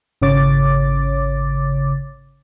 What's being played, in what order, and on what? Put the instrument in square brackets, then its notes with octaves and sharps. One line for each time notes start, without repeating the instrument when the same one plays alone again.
[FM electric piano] G#1 C#3 C#5 D6 A6